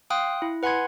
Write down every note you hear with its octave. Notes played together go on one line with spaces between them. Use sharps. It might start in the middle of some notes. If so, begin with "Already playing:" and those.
F5 G5 C6 D#6 F#6
E4
B4 F#5 G#5 B5 C6 G#6